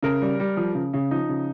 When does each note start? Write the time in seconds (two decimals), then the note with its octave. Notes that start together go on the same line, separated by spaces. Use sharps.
0.03 C#3 A#4
0.22 G3
0.40 G3
0.57 F3
0.75 C#3
0.94 C#3
1.11 F3 D#4
1.29 C#3